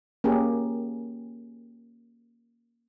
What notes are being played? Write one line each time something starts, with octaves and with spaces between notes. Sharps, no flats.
A#3 C#4 G4 G#4